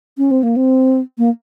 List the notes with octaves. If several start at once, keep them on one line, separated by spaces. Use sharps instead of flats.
C#4
C4
A#3
C4
A#3